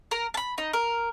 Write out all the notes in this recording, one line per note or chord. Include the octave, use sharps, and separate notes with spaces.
A#4
A5 B5
D#4
A#4